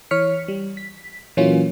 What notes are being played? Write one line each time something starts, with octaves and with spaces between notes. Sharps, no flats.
E3 C#5 F6 B6 C#7
G3
B6
A#2 E3 F#3 A#3 C#4 F4